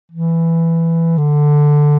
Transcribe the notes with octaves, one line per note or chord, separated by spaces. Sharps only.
E3
D3